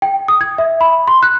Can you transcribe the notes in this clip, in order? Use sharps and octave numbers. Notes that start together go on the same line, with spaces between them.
G5
D#6
G#6
E5
B5
C6
F#6